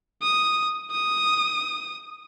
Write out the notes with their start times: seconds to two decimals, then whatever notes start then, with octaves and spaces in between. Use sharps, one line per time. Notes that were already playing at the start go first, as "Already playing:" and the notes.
0.22 D#6
0.92 D#6